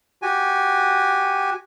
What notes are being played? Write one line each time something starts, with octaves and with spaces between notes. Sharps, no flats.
F#4 G4 G#5